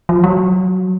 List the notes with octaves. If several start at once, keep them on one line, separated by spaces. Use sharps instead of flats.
F3
F#3